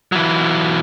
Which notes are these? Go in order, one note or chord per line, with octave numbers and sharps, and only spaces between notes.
E3 F#3